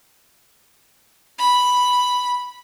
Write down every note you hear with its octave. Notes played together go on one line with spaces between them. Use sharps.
B5